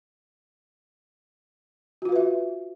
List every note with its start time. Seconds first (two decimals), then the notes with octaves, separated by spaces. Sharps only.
2.02 F#4
2.05 F4
2.09 F5
2.12 B4
2.16 E5